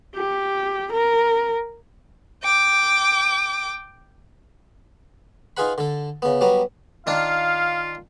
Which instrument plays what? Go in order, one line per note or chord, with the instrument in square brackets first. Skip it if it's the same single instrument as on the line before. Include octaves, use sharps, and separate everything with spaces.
[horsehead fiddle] G4
A#4
[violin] G5 D6
[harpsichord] D#4 F4 G#4 B4 F#5 B5
D3 A4
C#3 B3
F#3 G3 B3 A#5
[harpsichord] D#3 D4 [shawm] F4 [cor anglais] F5